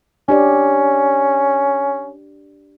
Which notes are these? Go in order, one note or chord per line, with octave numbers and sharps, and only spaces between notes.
C#4 D4 G4 D5